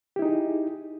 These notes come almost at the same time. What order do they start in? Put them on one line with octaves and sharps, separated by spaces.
G4 E4 D#4 G#4